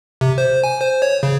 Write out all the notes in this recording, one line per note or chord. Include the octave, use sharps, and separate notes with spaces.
C3
C5
G#5
C5
C#5
C#3